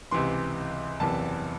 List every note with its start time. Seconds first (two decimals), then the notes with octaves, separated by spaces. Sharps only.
0.11 C#2 C3 E3 C6
1.00 F#1 E2 C3 E3 A5